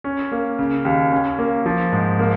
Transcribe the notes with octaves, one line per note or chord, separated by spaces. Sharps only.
C#4
A#3
C#3
D#2
C#4
A#3
F3
G#2
A#3